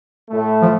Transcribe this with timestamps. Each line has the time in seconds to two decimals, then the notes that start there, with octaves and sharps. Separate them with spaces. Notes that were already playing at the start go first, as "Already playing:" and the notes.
0.30 A2 A3
0.62 F3